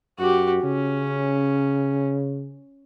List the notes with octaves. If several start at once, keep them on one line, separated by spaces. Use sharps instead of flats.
F#2 F#4 G4
C#3 C#4